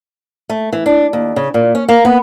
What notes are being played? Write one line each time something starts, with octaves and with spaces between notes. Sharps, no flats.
A3
E3
D4
D#2
C#3
A#2
C#4
A#3
B3